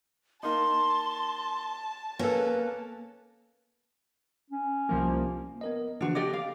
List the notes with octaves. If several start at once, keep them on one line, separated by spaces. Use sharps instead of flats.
A#3 D#4 A5 C6
A#3 C#4 A4 B4
C#4
C2 F3 A#3
B3 A#4 D#5
C#3 E3 F3 D4 F#4
G4 D5 D#5 D6
F5